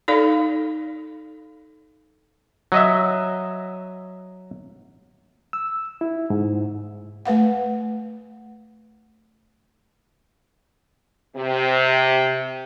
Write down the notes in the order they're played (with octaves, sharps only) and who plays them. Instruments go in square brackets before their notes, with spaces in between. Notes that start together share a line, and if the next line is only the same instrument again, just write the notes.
[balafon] D#4 A4 D5 F5 B5
[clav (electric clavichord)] F#3 D#5 E5
[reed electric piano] E6
E4
G#2
[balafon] A3 B4 F5 F#5
[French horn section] C3